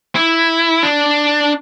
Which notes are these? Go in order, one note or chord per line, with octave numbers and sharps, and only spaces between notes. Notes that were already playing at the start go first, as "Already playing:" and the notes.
E4
D4